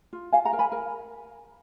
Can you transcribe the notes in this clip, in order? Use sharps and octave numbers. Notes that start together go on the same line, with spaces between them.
F4
F4 F5 G#5
F#5 A#5
A#4
G#5 B5
A#4